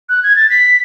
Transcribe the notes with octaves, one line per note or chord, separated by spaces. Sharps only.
F#6
G#6
A6
B6